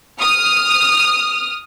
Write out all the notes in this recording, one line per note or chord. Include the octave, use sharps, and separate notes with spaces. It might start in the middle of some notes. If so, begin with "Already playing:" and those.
D#6 F6